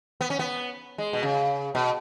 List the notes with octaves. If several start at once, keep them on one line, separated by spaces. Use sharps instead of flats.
B3
C#4
B3
G#3
B2
C#3
B2